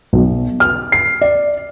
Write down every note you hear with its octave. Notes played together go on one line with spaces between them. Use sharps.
B1
F6
C7
D5